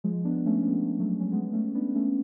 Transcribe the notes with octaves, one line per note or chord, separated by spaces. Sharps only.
F3 G#3
B3 D4
A3 C#4
C#4
G#3 B3
F#3 A3
C#4
G#3 B3
A3 C#4
B3 D4
A3 C#4